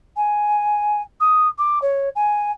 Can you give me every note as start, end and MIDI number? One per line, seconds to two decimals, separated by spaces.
0.16 1.02 80
1.20 1.48 87
1.58 1.79 86
1.82 2.09 73
2.15 2.51 80